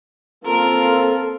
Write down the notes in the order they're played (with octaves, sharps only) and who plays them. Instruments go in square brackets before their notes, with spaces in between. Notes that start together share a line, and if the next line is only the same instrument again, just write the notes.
[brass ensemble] A#3 C4 F4 [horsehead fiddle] A4 [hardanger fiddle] A#4